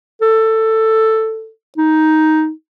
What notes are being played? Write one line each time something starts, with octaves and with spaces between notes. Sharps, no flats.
A4
D#4